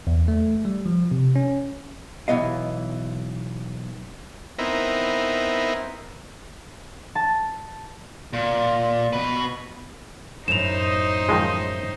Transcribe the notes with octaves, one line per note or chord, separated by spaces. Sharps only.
E2
A3
G3
F3
C3
C#4
B1 E3 F#3 B3 D#5 F5
B3 C4 D#4 E4 A#4
A5
A#2
B2 B4
F#2 A2 D#4 C5 D#5 E7 F7
D#3 F3 G#3